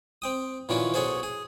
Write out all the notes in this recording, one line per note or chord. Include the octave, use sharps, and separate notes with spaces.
C4 G5 D#6
A#2 D#3 E3 C#4 F4 F#4
B1 C#4 F#4 G#4 A4 C5
G#4